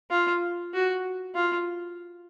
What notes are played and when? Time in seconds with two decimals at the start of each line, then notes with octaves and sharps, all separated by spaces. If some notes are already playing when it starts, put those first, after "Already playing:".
0.11 F4
0.73 F#4
1.35 F4